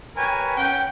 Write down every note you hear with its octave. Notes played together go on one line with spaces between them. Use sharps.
G4 A#4 B4 C#5 G#5
C#4 F#5 G5